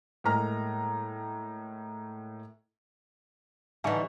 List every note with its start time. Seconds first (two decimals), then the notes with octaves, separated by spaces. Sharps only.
0.24 A2 G#3 A#3 A#5 F6
3.84 D3 E3 G3 D#4 E5 G#5 C#6